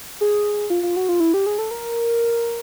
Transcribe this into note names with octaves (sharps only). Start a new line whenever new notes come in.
G#4
F4
F4
F#4
F4
E4
G4
G#4
A4
A#4